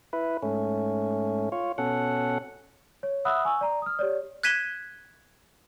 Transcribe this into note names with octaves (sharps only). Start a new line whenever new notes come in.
E4 B4
G#2 A3 C#4
F4 C#5
B2 C#4 A4 F#5
C#5
E5 F#5 B5 D#6 E6 F#6
G#5 C#6 E6
D5 A#5
D#6 F6
G4 C#5 D5
F#6 G#6 B6 D#7 E7 G7